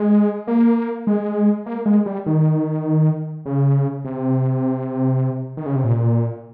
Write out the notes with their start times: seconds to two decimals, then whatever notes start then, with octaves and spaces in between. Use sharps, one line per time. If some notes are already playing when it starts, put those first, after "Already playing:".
Already playing: G#3
0.47 A#3
1.07 G#3
1.66 A#3
1.86 G#3
2.06 G3
2.26 D#3
3.46 C#3
4.05 C3
5.57 D#3
5.66 C#3
5.76 C3
5.84 A#2